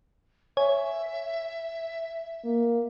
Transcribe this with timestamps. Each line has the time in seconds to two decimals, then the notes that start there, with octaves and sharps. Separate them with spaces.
0.57 C#5 E5 G#5
2.45 A#3